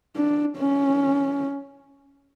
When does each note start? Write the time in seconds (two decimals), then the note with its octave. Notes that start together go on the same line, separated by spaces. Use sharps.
0.16 D4
0.57 C#4